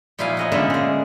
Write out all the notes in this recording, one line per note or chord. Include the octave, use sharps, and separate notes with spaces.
A#2 F3 D#4 E4 F5 G#5
C#5 D#5 F#5
A#2 D3 G#3 B3 C#4 E5
G#3 A#3